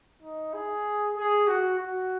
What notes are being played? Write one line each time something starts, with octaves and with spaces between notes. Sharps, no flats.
D#4
G#4
G#4
F#4
F#4